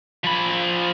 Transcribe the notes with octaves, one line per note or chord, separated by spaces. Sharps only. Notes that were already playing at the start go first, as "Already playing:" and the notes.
F3 B5